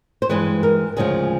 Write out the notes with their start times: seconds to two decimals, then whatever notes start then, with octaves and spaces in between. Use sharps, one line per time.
0.22 C5
0.29 G2 E3 G#3 B4
0.63 A#4
0.97 D2 C#3 F3 G#3 G#4